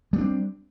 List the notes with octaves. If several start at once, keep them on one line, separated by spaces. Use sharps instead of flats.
G3 B3 C4 D4